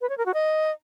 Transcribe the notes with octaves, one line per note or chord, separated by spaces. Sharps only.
B4
C#5
A#4
F#4
D#5